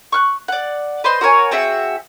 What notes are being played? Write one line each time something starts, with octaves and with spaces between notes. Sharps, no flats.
C#6 F6 F#6
D5 F#5
B4 C5 D#5 C6
F#4 A#4 C#5 G#5
C4 F#4 G#4 E5